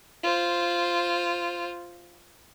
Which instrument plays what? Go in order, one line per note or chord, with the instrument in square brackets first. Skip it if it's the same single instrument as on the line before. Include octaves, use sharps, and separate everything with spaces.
[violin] F4 C5